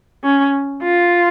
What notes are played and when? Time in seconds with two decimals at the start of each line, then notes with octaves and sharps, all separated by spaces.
0.24 C#4
0.82 F4